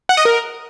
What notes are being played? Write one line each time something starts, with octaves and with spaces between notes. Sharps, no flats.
F#5
D#5
A#4